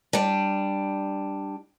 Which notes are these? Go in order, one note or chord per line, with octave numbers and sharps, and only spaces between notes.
G3 D4